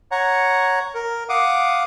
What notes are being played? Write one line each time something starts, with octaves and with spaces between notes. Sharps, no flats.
C#5 F#5 A#5
A#4
F5 F#5 D6 D#6